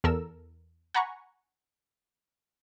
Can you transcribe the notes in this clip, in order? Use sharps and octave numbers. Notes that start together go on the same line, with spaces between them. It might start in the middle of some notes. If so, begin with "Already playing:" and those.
E2 A4 A#4 E6
F#5 G#5 A#5 B5 C#6